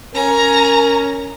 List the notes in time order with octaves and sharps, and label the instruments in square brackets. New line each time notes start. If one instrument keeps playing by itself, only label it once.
[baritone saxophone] C#4 [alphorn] A#4 [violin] G#5 A#5